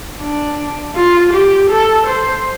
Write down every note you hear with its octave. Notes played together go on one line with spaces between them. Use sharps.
D4
F4
G4
A4
C5